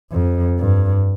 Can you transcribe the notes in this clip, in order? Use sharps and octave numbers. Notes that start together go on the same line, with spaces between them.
F2
G2